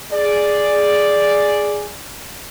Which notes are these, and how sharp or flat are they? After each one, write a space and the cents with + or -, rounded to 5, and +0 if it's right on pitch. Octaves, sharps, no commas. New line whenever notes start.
G#4 +0 D5 +0